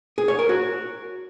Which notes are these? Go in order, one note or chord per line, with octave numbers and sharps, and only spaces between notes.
G#4
C#5
A#4
F#4